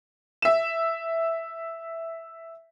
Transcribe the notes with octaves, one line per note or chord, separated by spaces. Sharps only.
E5 E7